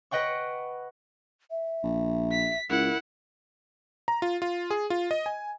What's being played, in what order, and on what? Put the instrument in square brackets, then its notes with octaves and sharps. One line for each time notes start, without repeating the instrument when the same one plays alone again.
[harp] B4 D#5 F#5 G5 C#6
[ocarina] E5
[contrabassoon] A#1
[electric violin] B6
[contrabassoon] C#2 [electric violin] E4 F#5 [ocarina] A#4
[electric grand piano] A#5
F4
F4
G#4
F4
D#5
G#5